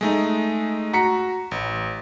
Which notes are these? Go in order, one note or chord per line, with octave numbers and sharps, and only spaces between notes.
G#3 A3 D#4
F#4 A#5 B6 C#7
A1